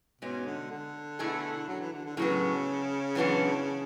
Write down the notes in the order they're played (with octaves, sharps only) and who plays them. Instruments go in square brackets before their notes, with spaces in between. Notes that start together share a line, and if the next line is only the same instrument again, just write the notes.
[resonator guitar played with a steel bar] G#2 G#3 C#4 [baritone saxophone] B2
[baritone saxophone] D3
D3
[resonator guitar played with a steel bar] B2 A3 E4 G#4
[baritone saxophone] F#3
E3
D3
D3
[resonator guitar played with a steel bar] A2 F#3 B3 [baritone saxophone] C#3
[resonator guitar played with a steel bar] F#2 E3 B3 D4 F#4